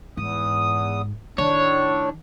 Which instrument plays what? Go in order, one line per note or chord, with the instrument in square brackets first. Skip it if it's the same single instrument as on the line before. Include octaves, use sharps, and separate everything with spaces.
[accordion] E2 D#6 [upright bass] G#2
[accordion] A2 D4 [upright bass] D#3 [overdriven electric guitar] C#5